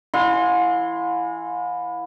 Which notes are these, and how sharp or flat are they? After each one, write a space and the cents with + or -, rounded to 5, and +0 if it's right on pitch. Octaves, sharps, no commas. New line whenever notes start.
E3 +10 F5 +45 C6 +0